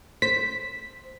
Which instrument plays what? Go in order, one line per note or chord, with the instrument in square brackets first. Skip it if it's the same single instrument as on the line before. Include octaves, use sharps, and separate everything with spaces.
[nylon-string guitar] C5 [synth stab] B6